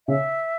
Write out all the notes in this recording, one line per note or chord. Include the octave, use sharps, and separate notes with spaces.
C#3 E5